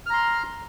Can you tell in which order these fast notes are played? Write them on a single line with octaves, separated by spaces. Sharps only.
F6 A#5 C6